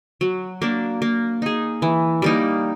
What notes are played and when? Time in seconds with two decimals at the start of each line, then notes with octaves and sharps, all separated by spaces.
0.21 F#3
0.62 A#3 D4
1.02 A#3
1.42 D#4 G#4
1.82 E3
2.22 G3 A#3 D#4